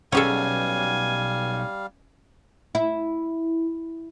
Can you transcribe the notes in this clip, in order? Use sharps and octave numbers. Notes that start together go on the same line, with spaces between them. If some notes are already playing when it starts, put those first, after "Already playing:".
B1 G3 C#4 G#4 A4 F5 G#5
E4